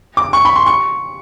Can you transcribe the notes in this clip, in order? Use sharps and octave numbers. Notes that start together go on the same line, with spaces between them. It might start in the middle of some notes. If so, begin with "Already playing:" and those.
D6
C#6
B5
C6
C#6